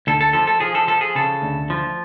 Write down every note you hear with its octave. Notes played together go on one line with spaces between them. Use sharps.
D2 A4
A4
F3 A4
A4
F3 G#4
A4
F3 A4
G#4
C#3 A4
D2
F3